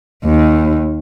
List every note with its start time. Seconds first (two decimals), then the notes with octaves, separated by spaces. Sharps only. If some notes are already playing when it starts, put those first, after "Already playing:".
0.25 D#2